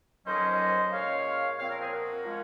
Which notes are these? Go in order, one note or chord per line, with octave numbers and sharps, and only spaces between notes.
F2 D#3 F#3 A#3 C#4 C5 D#5
A#2 G#3 C#4 C#5 F5
A#2 F3 C4 C#5 F5
A#4 C#5
G#4 C5
F#4 A#4
F3 G#3 C#4